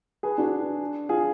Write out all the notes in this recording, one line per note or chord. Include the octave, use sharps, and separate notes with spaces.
G#4 B4
D4 F#4
F4 G#4